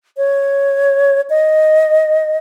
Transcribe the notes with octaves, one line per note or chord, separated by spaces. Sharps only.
C#5
D#5